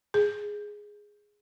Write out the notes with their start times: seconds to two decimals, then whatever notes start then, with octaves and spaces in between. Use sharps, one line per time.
0.14 G#4